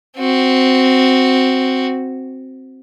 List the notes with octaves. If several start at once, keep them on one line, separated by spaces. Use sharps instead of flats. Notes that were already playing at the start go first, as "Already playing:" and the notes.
C4 F#4